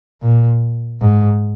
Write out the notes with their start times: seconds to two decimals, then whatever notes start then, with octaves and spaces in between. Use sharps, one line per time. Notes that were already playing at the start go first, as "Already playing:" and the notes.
0.22 A#2
1.01 G#2